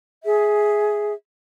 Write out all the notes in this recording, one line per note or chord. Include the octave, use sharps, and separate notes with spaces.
G#4 E5